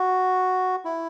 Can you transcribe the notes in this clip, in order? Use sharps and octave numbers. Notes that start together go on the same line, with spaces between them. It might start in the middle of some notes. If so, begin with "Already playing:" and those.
Already playing: F#4
E4